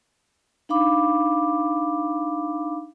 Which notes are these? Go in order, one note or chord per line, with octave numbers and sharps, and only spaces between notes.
D4 D#4 F5 B5 D6